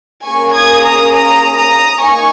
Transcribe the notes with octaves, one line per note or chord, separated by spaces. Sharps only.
A#3 C#4 G#4 G#5 C#6
D#6 G#6
A#5 D#6
A#5 D#6
A#5 D#6
A#3 D#4 G#5 C#6